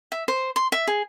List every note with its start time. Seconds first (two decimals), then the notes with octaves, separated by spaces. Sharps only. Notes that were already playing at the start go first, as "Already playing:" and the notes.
0.12 E5
0.28 C5
0.56 C6
0.72 E5
0.87 G#4